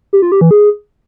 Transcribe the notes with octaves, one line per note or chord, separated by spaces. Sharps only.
G4
F4
G4
E3
G#4